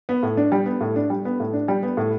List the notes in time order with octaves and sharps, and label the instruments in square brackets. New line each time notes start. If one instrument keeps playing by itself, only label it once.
[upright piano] B3
A2
D4
G3
B3
A2
D4
G3
B3
A2
D4
G3
B3
A2